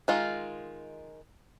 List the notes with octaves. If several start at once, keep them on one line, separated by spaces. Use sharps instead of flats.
D#3 G#3 D#4 F4